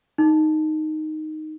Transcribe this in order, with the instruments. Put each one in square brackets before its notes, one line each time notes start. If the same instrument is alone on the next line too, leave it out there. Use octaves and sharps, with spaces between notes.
[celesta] D#4